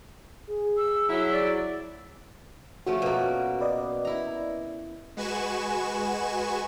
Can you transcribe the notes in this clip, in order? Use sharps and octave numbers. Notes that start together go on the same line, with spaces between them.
G#4
E6
F#3 E4
D5
F3 A3 C#4 F#4
B2 A#3
B4 D5 D#5
E4 A#5
G#3 F#4 B4 G#5 C#6 E7